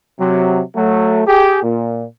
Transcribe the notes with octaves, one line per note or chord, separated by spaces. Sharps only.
C3 F#3
F#3 A3
G4 G#4
A#2